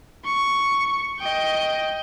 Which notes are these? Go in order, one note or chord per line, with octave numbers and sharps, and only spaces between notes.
C#6
D#5 G5